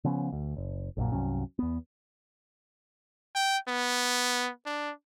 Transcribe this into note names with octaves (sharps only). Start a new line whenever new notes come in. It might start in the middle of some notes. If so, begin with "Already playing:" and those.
C#3 F3 B3 C#4
D2
F#1
A#1 F#2 A#2
C2 G2 F#3 C#4
E2 B3
G5
B3
D4